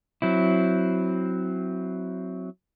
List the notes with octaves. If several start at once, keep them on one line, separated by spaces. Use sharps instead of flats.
F#3 C4 E4